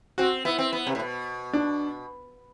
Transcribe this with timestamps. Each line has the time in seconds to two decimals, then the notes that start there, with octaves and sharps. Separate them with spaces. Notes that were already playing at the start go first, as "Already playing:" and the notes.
0.18 C4 F#4
0.45 B3 E4
0.58 C4
0.73 B3
0.87 C3
0.95 A2
0.99 B2
1.53 D4